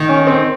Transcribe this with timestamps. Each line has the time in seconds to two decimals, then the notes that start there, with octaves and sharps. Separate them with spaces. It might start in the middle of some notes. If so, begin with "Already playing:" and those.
Already playing: D#3
0.09 C#4
0.27 C4